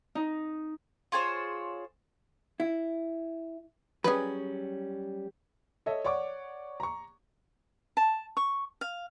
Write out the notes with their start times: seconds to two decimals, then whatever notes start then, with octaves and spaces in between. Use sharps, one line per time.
0.15 D#4
1.12 F4 G#4 C5 C#5
2.60 E4
4.04 F#3 G3 C#4 G#4 B4
5.86 A4 C#5 D#5 E5
6.04 C#5 D5 F#5 C#6 D6
6.80 A#5 C#6
7.97 A5
8.37 C#6
8.81 F5